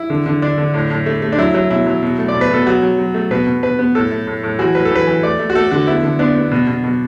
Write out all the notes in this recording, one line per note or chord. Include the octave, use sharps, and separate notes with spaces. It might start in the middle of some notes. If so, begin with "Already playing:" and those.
Already playing: E4
D3
D3
D3 D4
D3
A2
A2
A3
A3
D4
F#3 E4
F#3 E4
B2 E4
F#3
B2
A3
D5
B2
B4
B2 A4
F#3 F#4
F#3
F#3
A3
B2 B4
B2
B2 B4
B3
A2 A4
A3
A2
A2
E3 F#4
A2 B4
A4
E3 B4
E3
A3 D5
A3
F#4
A3 A4
D3 F#4
B3 E4
D3
B3 D4
B3
B2
B2
B2